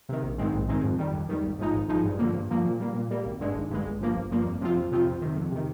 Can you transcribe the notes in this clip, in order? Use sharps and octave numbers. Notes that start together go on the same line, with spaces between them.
C3 D#3
A#1
G#2 D#3 G#3 C4
A#1
G#2 D#3 G#3 C4
F2
D#3 G3
F2
D#3 G3
G#1
G#2 F3 G#3 D#4
G#1
G#2 F3 G#3 D#4
G2
D3 F3 A#3
G2
D3 F3 A#3
A#2
G3 A#3
A#2
G3 A#3
G#1
G2 D3 G#3
G#1
G2 D3 G#3
G1
G2 F3 A#3
G1
G2 F3 A#3
F2
C3 F3 C4 F4
F2
C3 F3 C4 F4
F2
C3 D#3
F2
C3 D#3